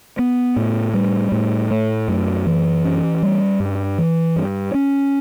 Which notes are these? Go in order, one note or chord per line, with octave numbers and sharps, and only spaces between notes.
B3
A2
G3
A2
A3
F#2
E3
C#4
G3
G2
E3
G2
C#4